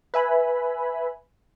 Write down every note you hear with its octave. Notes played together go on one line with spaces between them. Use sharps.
B4 E5 G#5 B5